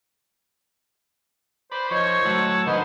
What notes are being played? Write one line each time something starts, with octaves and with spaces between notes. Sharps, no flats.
B4 C5 D5 B5
F3 D#4 C5 C#5 C#6
F#3 A3 F#5 A5 E6
D3 D#3 B4 C5 D#5 F#5